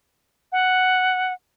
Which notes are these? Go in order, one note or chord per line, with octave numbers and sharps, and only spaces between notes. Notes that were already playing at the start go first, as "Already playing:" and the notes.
F#5